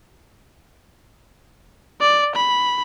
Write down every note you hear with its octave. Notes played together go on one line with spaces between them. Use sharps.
D5
B5